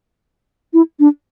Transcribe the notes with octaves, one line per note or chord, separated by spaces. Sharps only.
E4
D4